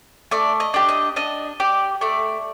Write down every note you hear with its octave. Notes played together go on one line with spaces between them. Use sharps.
A3 D5
D#5
D4 G4
D#5
D4 D#5
G4 D5
A3 D5